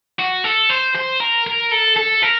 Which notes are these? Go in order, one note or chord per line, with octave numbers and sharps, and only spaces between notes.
F#4
A4
C5
C5
A#4
A#4
A4
A4
A#4